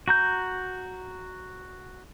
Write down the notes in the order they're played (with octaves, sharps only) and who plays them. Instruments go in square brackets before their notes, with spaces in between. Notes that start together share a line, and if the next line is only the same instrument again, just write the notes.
[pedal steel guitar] F#4 A#5 G6